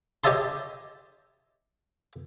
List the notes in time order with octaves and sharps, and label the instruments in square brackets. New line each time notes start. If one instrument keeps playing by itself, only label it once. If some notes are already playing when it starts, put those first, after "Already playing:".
[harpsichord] G4 C#5 D#5 E5 A5 C6